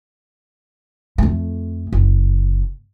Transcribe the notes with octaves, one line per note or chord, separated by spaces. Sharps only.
F2 A3
F#1